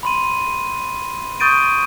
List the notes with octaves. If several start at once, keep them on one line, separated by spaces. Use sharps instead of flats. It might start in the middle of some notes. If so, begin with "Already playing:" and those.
B5 C6 D#7
C#6 D#6 G6 A6 D7 D#7